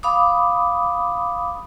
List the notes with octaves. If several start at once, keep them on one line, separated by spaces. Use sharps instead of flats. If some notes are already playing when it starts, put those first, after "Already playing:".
F5 B5 D6 D#6